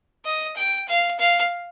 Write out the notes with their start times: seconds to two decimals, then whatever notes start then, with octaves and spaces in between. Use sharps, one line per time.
0.25 D#5
0.57 G5
0.88 F5
1.19 F5